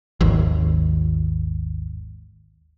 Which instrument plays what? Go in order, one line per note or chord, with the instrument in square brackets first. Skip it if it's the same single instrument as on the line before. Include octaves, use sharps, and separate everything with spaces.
[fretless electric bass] G#1 D#2